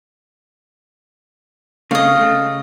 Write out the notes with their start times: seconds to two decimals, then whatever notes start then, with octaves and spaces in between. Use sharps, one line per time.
1.91 C#3 A3 C4 D#5 F5
2.17 C#3 A3